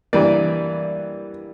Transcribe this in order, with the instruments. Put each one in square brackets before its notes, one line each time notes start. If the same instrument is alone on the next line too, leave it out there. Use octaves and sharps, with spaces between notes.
[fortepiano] G2 E3 G3 A#3 D5